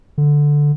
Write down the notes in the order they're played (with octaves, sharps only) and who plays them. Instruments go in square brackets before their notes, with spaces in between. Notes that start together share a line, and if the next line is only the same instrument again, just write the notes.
[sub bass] D3